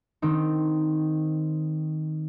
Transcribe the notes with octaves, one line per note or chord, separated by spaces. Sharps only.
D#3 C4 D#4